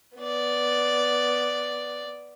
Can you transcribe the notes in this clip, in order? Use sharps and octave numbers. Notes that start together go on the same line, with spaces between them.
B3 D5